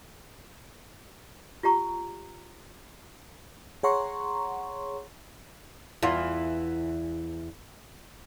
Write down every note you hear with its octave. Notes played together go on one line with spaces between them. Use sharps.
F4 G4 A#5 C#6
G#4 C#5 F#5 A#5 C6 C#6
E2 E3 F4